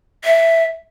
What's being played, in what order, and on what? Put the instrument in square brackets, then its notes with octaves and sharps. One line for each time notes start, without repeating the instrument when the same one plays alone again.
[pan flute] E5